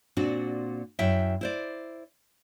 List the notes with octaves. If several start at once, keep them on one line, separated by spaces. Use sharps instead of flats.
A#2 C4 D4 F#4
F#2 E4 E5 G5
E4 C5 D5